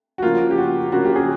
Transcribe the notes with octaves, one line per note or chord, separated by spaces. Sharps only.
F#4
C#3 F3 A#3 F4
G4
F#4
C#3 F3 A#3 F#4
G4
G#4